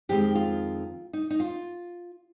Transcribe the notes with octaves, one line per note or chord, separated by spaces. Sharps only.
F2 D#3 G#3 C4 G4
F4
D#4
D#4
F4